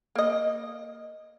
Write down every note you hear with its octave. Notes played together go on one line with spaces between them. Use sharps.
A#3 D#5